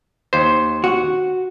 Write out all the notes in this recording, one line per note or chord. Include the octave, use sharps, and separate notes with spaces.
D#2 C5
F#4